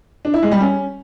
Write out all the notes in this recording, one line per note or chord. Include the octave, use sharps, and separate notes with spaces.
D4
E4
G#3
G3
C#4